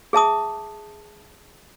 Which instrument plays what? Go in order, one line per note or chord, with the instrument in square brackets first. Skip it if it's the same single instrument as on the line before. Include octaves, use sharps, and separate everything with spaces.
[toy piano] G#4 E5 A5 D#6